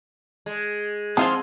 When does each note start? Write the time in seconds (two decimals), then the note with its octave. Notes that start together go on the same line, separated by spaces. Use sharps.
0.46 G#3
1.17 F3 C4 F4 G#4 F#5 A5